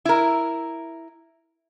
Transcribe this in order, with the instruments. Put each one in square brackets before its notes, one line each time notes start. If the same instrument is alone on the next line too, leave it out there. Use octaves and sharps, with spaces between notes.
[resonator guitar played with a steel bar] E4 A#4